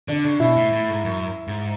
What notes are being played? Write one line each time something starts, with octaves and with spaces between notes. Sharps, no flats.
D3 D4
C#3
B2 E4
A2
A2
G#2
F#2
G#2